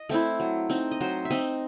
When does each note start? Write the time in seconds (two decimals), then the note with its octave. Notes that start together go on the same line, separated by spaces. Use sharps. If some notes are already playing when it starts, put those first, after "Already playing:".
Already playing: D#5
0.09 A3 C4 E4
0.40 F#3
0.70 C4 D#4
0.91 D#5
1.01 F#3 C5
1.25 E5
1.30 C4 D#4 D#5